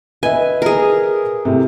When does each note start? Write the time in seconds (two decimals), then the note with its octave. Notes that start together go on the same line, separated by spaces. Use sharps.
0.23 B4 D#5 E5 G#5
0.62 G#4 A#4
1.45 A2 C3